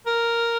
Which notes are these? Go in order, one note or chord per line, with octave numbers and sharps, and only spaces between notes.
A#4